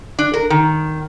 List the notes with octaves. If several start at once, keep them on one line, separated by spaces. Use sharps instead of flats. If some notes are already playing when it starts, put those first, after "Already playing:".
D4
A#4
D#3